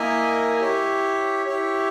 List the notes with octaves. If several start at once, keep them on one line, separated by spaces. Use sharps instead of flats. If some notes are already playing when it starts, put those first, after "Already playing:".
Already playing: A#3 E4 A#4 D#5 G#5
E4 G4 C#5
E4 G4 C#5